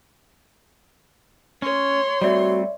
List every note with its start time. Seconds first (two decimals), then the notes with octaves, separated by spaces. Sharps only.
1.62 C#4 C#5 C6
2.22 G3 A3 C4 F#4 D5 E5